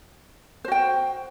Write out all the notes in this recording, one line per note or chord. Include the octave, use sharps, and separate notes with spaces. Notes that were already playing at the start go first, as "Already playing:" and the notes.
F#4 C5 G5